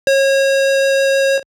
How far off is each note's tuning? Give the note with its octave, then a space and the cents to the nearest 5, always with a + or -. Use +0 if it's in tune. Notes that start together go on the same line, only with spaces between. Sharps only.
C#5 -30